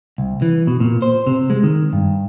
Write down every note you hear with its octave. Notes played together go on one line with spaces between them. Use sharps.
C2
E3
B2
A#2
C5
C3
G#3
D#3
G2